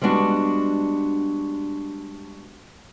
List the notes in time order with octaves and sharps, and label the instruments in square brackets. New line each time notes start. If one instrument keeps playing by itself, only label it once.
[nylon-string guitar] G3 G#3 B3 D4 F#4